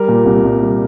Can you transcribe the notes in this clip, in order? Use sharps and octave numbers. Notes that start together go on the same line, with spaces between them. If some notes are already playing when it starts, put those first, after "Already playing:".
Already playing: G3 A#4
A#2
C2
C2
G3